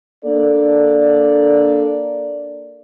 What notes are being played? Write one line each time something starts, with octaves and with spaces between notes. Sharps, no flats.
A#3 D4 A4 D5